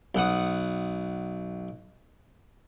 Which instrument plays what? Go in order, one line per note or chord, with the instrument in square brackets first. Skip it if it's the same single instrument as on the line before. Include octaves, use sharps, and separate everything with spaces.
[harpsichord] B1 F#5 D#6